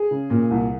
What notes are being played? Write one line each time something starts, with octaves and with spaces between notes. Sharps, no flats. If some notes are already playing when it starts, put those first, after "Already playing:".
Already playing: G#4
C#3
A#2
C2